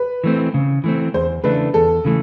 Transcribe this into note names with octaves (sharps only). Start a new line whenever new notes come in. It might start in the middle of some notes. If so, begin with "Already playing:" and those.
Already playing: B4
E3 A3 C4
C#3
E3 A3 C4
E2 C5
C#3 E3 A3 D4 B4
E2 A4
C#3 E3 A3